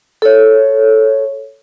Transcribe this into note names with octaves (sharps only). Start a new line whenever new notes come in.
A4 C#5